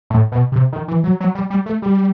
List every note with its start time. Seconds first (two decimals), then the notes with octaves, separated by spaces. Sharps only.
0.10 A2
0.32 B2
0.52 C3
0.73 D#3
0.88 E3
1.04 F#3
1.20 F#3
1.35 G3
1.50 G3
1.66 A3
1.82 G3